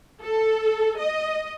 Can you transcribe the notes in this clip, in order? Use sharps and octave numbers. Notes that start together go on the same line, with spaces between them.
A4
D#5